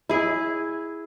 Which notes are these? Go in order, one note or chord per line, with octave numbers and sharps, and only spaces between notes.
E4 G#4